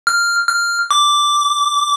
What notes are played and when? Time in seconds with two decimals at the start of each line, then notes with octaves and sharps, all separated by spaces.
0.07 F6
0.49 F6
0.91 D6